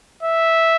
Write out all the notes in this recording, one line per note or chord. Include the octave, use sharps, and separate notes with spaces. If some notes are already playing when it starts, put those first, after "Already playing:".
E5